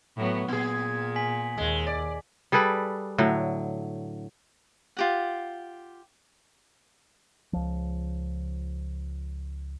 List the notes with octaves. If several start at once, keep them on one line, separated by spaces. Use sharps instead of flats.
A2 F#3 B3
A#2 B3 G#4
G#5 B6 F#7
D#2 G#3
D5
G3 G#4 A4 B4
A2 D3 F#3
F4 G4 F#5
C#2 F3